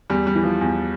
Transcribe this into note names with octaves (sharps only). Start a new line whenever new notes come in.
E2 G3
G3
E3
F3
E2